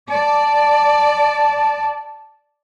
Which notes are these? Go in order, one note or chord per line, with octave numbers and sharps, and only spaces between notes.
D5 A5